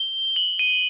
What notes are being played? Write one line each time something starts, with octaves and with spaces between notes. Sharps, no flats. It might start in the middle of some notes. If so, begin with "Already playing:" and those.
Already playing: G7
F#7
D#7